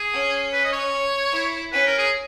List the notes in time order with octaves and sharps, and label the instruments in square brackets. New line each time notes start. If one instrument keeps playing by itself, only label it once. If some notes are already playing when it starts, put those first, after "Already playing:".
Already playing: [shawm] G#4
[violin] C#4
[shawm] B4
D#5
C#5
[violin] E4
[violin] C#4 [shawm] B4
[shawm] A#4
G#4